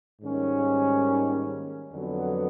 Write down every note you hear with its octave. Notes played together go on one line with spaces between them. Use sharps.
G#2 D#3 G3 A#3 C#4
F2 D3 F#3 B3